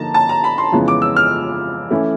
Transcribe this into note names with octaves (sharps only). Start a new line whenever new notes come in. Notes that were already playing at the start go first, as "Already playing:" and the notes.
Already playing: D3 F3 A#3 D#4 A5 A#5
A5
A#5
B5
C6
F2 C#3 E3 G#3 B3
D6
E6
F6
E3 A3 C#4 E4